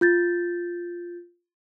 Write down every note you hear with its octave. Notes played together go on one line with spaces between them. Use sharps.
F4 G6 A6